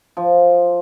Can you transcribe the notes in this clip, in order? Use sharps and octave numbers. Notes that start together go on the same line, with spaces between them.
F3